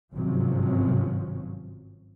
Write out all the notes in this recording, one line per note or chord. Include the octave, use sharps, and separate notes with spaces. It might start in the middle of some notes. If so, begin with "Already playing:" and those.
G#1 G2 C3 F3 F#3 C#4